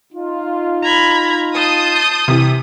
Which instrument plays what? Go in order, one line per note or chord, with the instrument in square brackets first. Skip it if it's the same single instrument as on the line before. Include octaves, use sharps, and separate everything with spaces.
[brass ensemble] D#4 F4
[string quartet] A#5 B5 G#6
[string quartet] A5 C6 G6 [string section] D#6
[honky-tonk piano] C3 E3